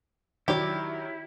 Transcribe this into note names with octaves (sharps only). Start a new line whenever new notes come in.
D#3 F#3 E4 G4 D5